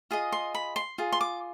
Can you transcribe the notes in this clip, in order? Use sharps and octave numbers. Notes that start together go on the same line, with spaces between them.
F4 G#4 D#5
C6
B5
C6
F4 G#4
C6
D6